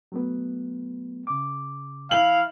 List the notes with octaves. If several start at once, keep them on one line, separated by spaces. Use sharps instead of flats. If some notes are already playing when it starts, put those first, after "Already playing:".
F#3 A3 B3
C#3 D6
E3 E4 F5 F#7